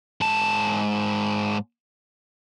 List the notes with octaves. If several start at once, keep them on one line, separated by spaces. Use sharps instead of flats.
G#2 A5